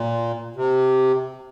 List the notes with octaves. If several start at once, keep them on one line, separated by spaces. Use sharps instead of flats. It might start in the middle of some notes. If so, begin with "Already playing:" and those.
Already playing: A#2
C3